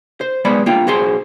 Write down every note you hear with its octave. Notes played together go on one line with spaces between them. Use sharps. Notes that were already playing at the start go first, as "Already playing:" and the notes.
C5
B1 G#3 B3 D5 B5
A#3 D4 F4 G5
B1 F#4 G#4 C5 C6